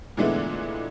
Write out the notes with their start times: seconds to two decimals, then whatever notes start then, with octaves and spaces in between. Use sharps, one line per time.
0.17 A#2 D3 E3 G#3 A3 B3